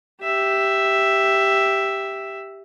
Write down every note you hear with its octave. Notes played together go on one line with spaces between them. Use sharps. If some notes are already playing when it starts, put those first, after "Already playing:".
G4 E5